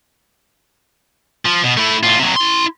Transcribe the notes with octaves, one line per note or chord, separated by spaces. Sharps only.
F3
B2
A3 E4
A2 F4
C3 F#3
E4 C6